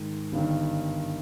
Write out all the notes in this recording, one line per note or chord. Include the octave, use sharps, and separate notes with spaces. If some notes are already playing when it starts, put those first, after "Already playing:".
Already playing: G#2 D#3 G#3
G1 G2 D#3